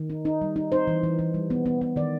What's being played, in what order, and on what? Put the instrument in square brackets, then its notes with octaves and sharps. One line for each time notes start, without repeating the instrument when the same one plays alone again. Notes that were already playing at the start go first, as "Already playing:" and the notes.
Already playing: [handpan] D#3
D#4
D#4
G3
D#4
D#4 C5
E3
E3
E3
G3
B3
B3
B3
D#3 D5